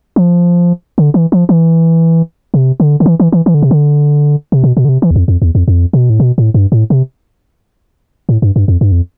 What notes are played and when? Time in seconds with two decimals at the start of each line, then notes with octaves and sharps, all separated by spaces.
0.16 F3
0.98 D3
1.14 E3
1.32 F3
1.49 E3
2.54 C3
2.80 D3
3.00 D3
3.06 E3
3.20 E3
3.32 E3
3.46 E3
3.54 D3
3.62 C3
3.71 D3
4.52 C3
4.64 B2
4.77 B2
4.85 D3
4.89 C3
5.02 E3
5.11 E2
5.16 F2
5.28 F2
5.42 E2
5.55 F2
5.68 F2
5.93 B2
6.10 A2
6.20 B2
6.38 A2
6.54 G2
6.72 A2
6.90 C3
8.29 A2
8.42 G2
8.56 G2
8.68 F2
8.81 G2
8.92 F2